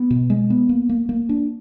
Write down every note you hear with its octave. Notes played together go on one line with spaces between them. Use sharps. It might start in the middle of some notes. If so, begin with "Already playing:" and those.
Already playing: B3
B2
G#3
B3
A#3
A#3
A#3
D4